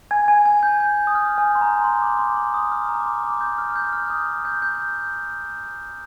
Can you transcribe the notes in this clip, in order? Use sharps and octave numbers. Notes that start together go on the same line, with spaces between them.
G#5 G#6
G#5 G#6
G#5 G#6
G6
G6
D#6
F6
G#5
C6
A#5
C6
D6
C6
C6
D#6
F6
A#5
D6
C6
D6
G6
F6
F6
G6
F6
D#6
G6
G6